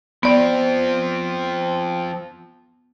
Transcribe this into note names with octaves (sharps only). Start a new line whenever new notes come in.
F3 B3 C4 D5